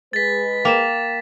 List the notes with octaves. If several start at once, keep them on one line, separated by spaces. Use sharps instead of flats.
G#3 B4 A6 B6
A#3 G5 E7